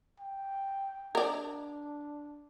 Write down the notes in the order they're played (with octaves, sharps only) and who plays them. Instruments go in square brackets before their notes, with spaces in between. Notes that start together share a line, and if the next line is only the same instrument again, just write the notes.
[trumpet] G5
[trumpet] D4 [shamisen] A#4 D5